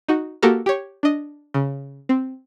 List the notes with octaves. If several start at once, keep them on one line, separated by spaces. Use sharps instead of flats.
D#4 F#4
A#3 F#4 G4 A4 A#4
G4 C#5
D4 D#5
C#3
C4